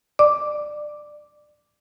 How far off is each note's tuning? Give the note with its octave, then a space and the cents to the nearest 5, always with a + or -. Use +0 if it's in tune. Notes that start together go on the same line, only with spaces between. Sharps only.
D5 +20 D6 +0